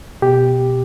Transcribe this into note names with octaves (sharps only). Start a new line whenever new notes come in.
B2 G4